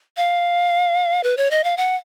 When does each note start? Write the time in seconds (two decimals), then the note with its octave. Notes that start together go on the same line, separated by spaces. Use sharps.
0.17 F5
1.23 B4
1.37 C#5
1.51 D#5
1.64 F5
1.77 F#5